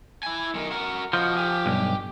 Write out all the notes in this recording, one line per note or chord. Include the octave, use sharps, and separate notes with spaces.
E4 G#5
B1 D#3
F#4 A#4
F3 F#4 D#5
G4 G#5
B1 G2